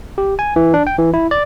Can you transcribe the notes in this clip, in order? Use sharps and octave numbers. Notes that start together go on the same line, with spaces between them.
G4
G#5
E3
D4
G5
E3
E4
D5